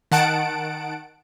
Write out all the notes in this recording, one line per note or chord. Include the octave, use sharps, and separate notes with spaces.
D#3 F#5 A5 D7